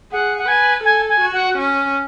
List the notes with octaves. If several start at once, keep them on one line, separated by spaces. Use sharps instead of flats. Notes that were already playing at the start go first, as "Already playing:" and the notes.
G#4 F#5
F#5
B4 G#5
A4 G#5
G#5
F#4
F#5
C#4